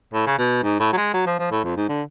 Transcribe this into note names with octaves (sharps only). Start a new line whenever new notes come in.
A2
C#3
B2
G#2
A2
F#3
G#3
F#3
F3
F3
A2
F2
G#2
D3